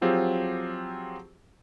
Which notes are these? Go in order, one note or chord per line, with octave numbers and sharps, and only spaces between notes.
F3 F#3 C4 F4 G4 G#4